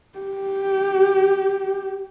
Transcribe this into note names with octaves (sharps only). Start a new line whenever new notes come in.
G4